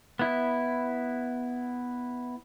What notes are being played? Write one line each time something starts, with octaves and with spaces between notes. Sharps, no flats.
B3 E4